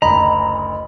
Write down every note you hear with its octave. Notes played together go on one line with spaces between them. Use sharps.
F#1 D2 D#5 A#5 B5